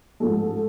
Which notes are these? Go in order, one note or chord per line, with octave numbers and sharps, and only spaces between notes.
A1 G#2 F3 G#3 A4